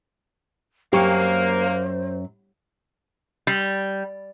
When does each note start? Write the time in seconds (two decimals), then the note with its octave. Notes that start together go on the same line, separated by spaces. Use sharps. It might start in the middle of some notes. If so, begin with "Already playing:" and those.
0.93 F#2 A#3 G4 C5 C#6
3.47 G3